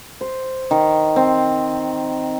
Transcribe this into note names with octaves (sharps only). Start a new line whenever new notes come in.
C5
D#3
C4